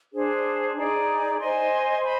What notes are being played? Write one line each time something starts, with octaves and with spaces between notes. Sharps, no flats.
D4 G#4 C5
D#4 G#4 D5
C5 D#5 G#5 C6
C5 D#5 B5